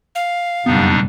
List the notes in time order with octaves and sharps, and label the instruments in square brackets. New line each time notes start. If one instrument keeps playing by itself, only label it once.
[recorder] F5
[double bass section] F#1 B2 G3 [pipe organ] F2 D4 D#4 [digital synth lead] B3